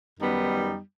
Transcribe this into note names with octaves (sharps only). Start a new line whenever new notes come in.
F#2 D#3 G3 B3 D#4